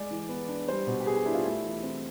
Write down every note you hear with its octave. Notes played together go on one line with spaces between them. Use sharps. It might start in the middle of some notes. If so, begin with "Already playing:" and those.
Already playing: G#3 D5
E3
B3
D4
G3 C5
B2
G4
B3 G#4
G4
D4 E4
F4
A3 E4
E3
C4